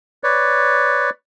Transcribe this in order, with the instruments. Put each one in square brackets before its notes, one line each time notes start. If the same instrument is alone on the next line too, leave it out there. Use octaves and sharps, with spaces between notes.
[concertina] B4 C#5 D5